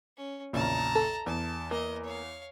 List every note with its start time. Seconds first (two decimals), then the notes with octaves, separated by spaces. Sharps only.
0.17 C#4
0.53 A#1 E2 C#3 A5 A#5
0.95 A4
1.26 E2 A5
1.71 A#3 D#5
2.04 C#5 F5